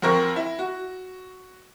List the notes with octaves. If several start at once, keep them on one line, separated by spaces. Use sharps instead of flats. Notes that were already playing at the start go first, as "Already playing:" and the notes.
F2 C4 A#4 C#6 A#6
E4
F#4